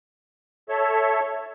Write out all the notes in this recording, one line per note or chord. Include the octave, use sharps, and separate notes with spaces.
A4 C#5 E5